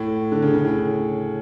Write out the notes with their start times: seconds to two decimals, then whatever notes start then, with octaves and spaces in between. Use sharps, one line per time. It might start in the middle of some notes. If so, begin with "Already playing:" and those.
Already playing: A2
0.32 D3
0.43 C#3
0.54 C#3
0.64 A2